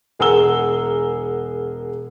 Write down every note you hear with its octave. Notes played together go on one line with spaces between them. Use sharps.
E1 G#4 A#4 F#5 E6 G7